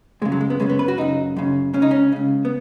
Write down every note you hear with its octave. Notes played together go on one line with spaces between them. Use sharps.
F#2 C#3 G#3
F#3
G#3
B3
F#2 C#3 G#3
B3
B4
F#4
F#2 C#3 D#4
F#2 C#3
C#2 C#3 C#4
D#4
C#4
C#2 C#3
B3